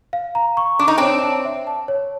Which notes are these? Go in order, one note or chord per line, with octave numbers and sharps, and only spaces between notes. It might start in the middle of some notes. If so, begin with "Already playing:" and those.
F5
A#5
C#6
D4 D6
D#4
C4 D4 C#5
A5
E5
A5
C#5